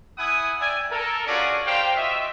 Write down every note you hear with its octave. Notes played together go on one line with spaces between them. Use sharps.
E4 F#5 G#5 B5 D#6
D5 E5 G5 G#5
A4 A#4
C#4 D4 F4 F#4 G#4 D5
G4 A#4 C5 F5 G5
F4 F#4 D#5 E5